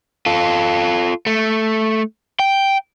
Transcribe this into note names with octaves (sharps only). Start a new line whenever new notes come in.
F4 A4
A3
G5